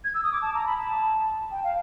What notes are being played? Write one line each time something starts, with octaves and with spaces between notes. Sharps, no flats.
G#6
E6
D#6
D6
A5
A#5
B5
A5
G5
F5